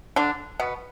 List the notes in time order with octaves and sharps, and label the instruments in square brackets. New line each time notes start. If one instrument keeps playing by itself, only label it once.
[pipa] D3 D4
B2 B3